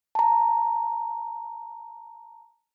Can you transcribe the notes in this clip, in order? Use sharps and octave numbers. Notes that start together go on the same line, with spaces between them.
A5 A#5